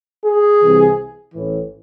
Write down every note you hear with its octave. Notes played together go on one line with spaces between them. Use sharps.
G#4
C2 C3 E3
A1 A2 E3